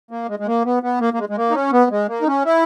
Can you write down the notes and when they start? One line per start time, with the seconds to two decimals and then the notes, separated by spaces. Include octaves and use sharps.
0.11 A#3
0.29 G#3
0.39 G#3
0.47 A#3
0.65 B3
0.83 B3
1.00 A#3
1.14 A#3
1.19 G#3
1.29 G#3
1.37 A#3
1.50 D#4
1.55 C#4
1.72 B3
1.91 G#3
2.08 A#3
2.22 D#4
2.27 C#4
2.45 E4